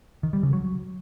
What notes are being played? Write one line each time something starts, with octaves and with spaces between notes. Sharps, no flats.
D#3
G3
C#3
F#3